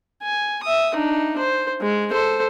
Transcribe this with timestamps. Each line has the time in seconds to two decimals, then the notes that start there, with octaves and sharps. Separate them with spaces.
0.23 G#5
0.63 E5 D#6
0.95 D4 D#4
1.38 C5
1.81 G#3
2.11 A4 C5